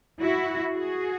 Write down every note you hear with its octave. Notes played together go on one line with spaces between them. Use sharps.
E4 F#4
F#4 G#4